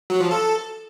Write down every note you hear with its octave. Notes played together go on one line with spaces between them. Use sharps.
F#3
F3
A4